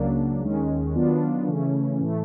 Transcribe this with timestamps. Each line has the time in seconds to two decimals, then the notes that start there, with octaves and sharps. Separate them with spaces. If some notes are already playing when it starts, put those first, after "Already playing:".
Already playing: C#2 C#3 F#3 A#3 D4
0.42 D#2 D#3 G#3 C#4
0.95 D#3 F#3 B3 D4 F4
1.48 C#3 E3 A3 C#4
2.00 A2 E3 A3